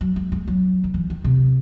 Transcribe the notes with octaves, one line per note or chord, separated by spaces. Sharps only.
F#3
G#3
G#3
F#3
D#3
E3
D#3
C3